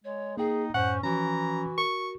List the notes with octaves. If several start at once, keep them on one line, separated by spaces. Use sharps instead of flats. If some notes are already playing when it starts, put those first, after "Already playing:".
G#3 C#5
A#3 D#4 G#4 G5
F#2 A2 C#4 C5 F#5
E3 F3 C#4 F#4 A#5
A#4 C#6